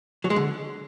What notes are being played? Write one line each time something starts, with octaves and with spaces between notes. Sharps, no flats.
F#3
G#3
D3